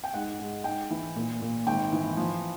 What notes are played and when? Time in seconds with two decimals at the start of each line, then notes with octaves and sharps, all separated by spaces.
0.04 G5
0.14 G#2 F#5
0.39 G#3
0.64 G#2 G5
0.91 E3
1.16 A#2
1.41 A#2
1.67 G#1 G5
1.93 E3
2.17 F3